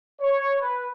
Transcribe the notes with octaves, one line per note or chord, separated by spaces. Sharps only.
C#5
B4